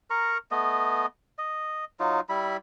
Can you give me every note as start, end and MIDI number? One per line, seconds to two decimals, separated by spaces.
0.10 0.38 70
0.10 0.38 82
0.10 0.38 85
0.51 1.06 57
0.51 1.06 59
0.51 1.06 75
1.38 1.85 75
2.00 2.20 54
2.00 2.20 63
2.00 2.20 65
2.29 2.57 55
2.29 2.57 64
2.29 2.57 83